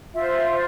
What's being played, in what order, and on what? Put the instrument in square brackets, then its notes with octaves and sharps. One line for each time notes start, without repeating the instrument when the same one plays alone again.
[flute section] F4 C5 E5